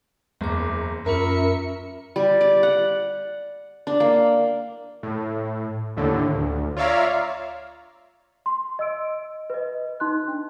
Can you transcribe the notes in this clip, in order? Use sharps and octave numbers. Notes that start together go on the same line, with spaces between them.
F#1 E2 A#5 D6
F#2 C#4 F4 A#4 E5 B5 C#7
G3
D5
F#5
D4
A#3
A2
D#2 A2 D3
D2
F4 C#5 D5 E5 F5 A#5
C6
D#5 E6 D7
B4 D#5
D#4 C6 F#6
D4